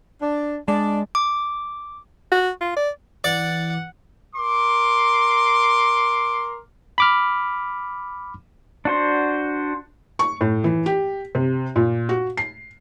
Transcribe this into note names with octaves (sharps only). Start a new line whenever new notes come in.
D4
G#3 D4 D5
D6
F#4
F4
D5
E3 D5 F#5
A#4 C6 D6
B5 D6 F6
D4 F#4 C5
C#6
A2
E3
G4
C3
A#2
F#4
C7